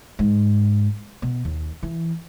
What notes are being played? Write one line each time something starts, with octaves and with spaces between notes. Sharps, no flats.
G#2
B2
D#2
E3